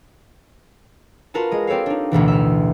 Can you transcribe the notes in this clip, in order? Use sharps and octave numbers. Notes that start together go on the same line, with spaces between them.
F4 F#4 A#4 B4 A5
G#3 D#5 D#6
C4 G4 A4 C#5 F5
D4 D#4
A1 D2 B2 E3
E5 F6